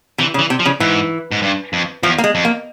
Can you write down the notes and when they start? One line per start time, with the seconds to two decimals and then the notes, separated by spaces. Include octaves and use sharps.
0.18 C3 E3
0.34 C#3
0.39 E3
0.50 C3
0.59 F3
0.65 C#3
0.80 G#2 E3
1.31 G#2
1.42 G2
1.73 F2
2.03 E2 F3
2.18 A#3
2.24 G#3
2.35 F2
2.45 A#3